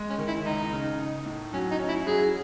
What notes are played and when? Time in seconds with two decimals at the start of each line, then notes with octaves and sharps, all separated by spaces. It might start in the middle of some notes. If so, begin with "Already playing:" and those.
Already playing: G#3
0.10 C#4
0.18 D#3
0.27 E4
0.45 C#2 D#4
0.73 C#3
1.00 D#4
1.26 A2
1.53 F#3 C#4
1.71 D#4
1.79 C#4
1.88 E4
2.07 F#3 G#4